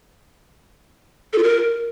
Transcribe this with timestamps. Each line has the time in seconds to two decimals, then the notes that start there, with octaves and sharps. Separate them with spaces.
1.33 A4
1.38 F4
1.43 A#4